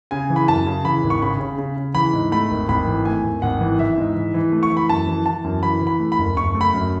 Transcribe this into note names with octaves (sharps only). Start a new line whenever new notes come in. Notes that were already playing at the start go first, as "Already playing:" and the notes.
C#3 G#5
E3
B5
F#2 A5
C#3
E3 B5
G#1
C#6
C#3 B5
C#3
C#3
C#3
E3 B5
G#2
A3 B5
G#1
G#1 B5
E3
A3 G#5
G#1
G#1 F#5
E3
E3 E5
G#2
E3
E3
A3
C#6
E3
B5
F#2 A5
E3
E3 A5
F#2
E3 B5
E3
B5
A3
B5
F#1
F#1 C#6
A3
B5
F#2